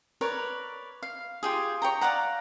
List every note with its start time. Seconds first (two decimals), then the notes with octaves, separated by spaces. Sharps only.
0.21 A#4 B4 C#5 D5
1.03 F5
1.43 F4 G4 G#4
1.82 C#5 G5 A#5
2.01 D5 F5 F#5 A#5